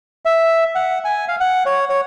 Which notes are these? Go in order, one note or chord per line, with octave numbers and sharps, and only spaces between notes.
E5
F#5
G#5
F5
F#5
C#5
C#5